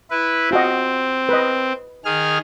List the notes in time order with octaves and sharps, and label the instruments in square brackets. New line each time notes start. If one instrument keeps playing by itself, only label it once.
[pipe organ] E4 B4
[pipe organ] C4 [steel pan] F4 F#4 D#5
[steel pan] B4 D#5
[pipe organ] D#3 G#4 F6